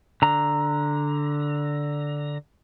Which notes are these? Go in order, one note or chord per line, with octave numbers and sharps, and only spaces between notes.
D3 A#5